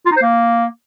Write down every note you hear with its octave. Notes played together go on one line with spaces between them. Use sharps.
F4
D#4
C5
A#3